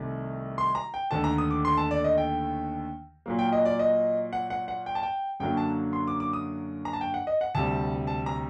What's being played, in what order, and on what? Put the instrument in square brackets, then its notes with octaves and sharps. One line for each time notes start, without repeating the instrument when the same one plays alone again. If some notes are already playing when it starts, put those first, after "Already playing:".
Already playing: [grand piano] C2 C3 D#3 A3
C6
A#5
G5
D#2 D3 A3 A5
A#5
D#6
D6
C6
A5
D5
D#5
G5
A#2 F#3 A#3
G5
D#5
D5
D#5
F#5
F#5
F#5
G5
A5
G5
F#2 D3 F#3 A#3 G5
A5
C6
D6
D6
D#6
A#5
A5
G5
F#5
D#5
F#5
D2 C3 G3 A5
A5
A#5